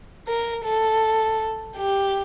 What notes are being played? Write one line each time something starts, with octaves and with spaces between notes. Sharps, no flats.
A#4
A4
G4